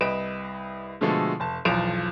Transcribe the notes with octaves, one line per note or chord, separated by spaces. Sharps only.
C2 B4 D#5 D7 E7
B2 D3 F3 G#3 A3 A4
F1 A5
B1 E2 F3 D7 E7 F7